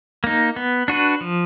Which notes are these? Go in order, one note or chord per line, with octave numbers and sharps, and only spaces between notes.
A#3 D#4
B3
D4 F#4 B4
F3